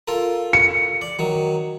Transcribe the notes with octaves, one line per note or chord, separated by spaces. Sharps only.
F4 A4 A#4
C#7
D5
D#3 F#3